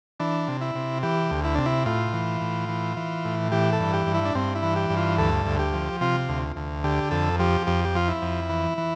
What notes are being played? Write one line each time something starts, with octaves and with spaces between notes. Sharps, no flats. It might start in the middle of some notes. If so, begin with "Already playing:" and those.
E3 D4
C3
E4
C3
E3 G4
D2
E4
C3 D4
E4
A2 F4
E3
A2
E3
E3
A2
E3 G4
A4
G2
G4
G2
E4
D4
G2 C4
E4
E3
G4
G2
F4
D2 A4
D2
G4
F3
C3 F4
D2
D2
D3 G4
F2 A4
F3 G4
F2 G4
G4
F3 F4
E4
F2
E3
E3